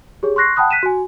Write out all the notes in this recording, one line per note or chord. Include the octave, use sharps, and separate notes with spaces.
G4 G#4 C#5
C6 C#6 F#6 A#6 C7
F#5 G5 A5 B5 D#6 F#6
F#6 B6 D#7 E7
F#4 G#5